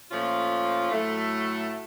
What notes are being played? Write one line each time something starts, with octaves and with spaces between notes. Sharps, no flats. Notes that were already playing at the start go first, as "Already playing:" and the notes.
A#2 F3 A3 C#4 F4
A2 F#3 A3